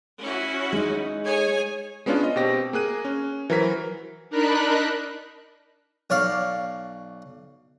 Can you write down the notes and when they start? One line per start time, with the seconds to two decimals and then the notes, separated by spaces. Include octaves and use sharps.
0.21 C#4 E4 F#4
0.72 G#3 D#4
1.25 G#4 C#5 G#5
2.06 G#3 B3 C#4 D4 F4
2.24 D#5
2.36 B2 C4 G4 A#6
2.73 A#3 G#4 F#6 D#7
3.05 C#4
3.50 E3 F#3 A#4 C5 B6
4.30 D4 D#4 A#4 B5 F#6
6.10 B1 C#5 D5 F5